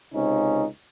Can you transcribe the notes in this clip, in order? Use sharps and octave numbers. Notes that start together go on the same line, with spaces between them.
C#2 C3 C#4 D#4